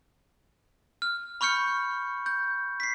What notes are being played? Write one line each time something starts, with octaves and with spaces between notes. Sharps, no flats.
F6
B5 C#6 F6 G6 C#7
G6
B6 C7